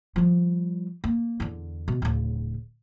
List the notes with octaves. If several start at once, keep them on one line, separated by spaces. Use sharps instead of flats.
F3 G3
A#3
E2 D3
B2
D1 C#3